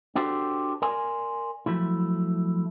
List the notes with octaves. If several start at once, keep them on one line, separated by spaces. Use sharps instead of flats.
D4 F#4 G4 A4 C5
A#4 D5 G#5 C6
F3 F#3 A3 E4